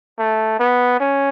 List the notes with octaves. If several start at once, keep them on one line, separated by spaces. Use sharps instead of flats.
A3
B3
C#4